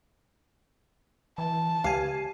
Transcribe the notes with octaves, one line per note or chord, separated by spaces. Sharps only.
E3 A5
C#2 G4 F5 G#5